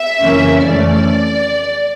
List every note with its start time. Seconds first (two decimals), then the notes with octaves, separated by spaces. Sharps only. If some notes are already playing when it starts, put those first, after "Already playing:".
Already playing: E5
0.22 F2 C#3 E3 A#3 C#4
0.63 F2 E3 A3 C#4 D5